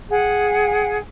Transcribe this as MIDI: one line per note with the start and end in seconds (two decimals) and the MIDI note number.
0.11 0.97 68
0.11 0.97 78
0.11 0.97 79